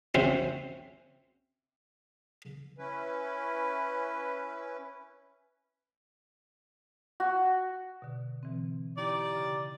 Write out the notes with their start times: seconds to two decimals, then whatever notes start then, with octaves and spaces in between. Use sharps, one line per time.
0.15 C4 C#4 F#4 C5 E5
2.78 C#4 E4 B4
7.20 F#4
8.02 B2 D3
8.43 B2 E3 C4
8.97 D#4 E4 G4 D5
9.36 C#3